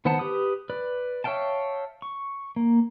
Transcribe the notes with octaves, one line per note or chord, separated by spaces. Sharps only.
D#3 B3 C5 F#5 A5
G4 B4 D#6
B4 D5
C#5 E5 F5 G5 A5
C#6
A#3